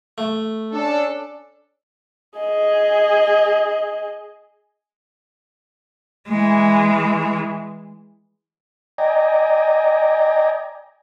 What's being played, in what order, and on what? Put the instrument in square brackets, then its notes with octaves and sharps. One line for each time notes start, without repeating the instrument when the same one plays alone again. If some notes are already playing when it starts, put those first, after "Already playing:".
[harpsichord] A3
[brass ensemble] C#4 D4 A4
[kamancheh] G#4 D#5
[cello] E3 G#3
[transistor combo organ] D5 D#5 G5 G#5 A#5